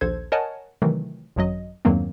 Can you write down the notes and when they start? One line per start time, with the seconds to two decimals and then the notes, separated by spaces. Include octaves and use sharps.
0.01 A#1 D#2 A4 C5 G#6
0.32 A#4 C#5 D#5 F#5 G#5 A5
0.82 C3 D#3 E3 F#3 A3
1.36 G#1 F#2 F#3 D#5
1.85 E2 G2 D#3 F#3 A#3 C4